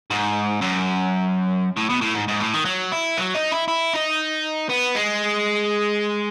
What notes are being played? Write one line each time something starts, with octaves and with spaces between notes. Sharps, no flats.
G#2
F#2
A2
B2
A2
G#2
G#2
A2
D#3
F#3
E4
F#3
D#4
E4
E4
D#4
B3
G#3